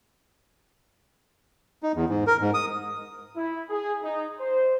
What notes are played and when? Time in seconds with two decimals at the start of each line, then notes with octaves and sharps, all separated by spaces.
1.83 D#4
1.95 E2
2.09 G#2
2.27 A#4
2.41 G#2
2.54 D#6
3.36 E4
3.70 G#4
4.03 D#4
4.40 C5